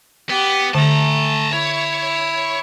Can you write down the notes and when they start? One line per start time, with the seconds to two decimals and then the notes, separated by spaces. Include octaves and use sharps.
0.30 B3 G4
0.75 D3 A3 A5 A#5
1.53 E4 C#5